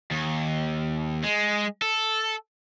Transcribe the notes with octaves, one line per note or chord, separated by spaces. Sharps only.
D#2
G#3
A4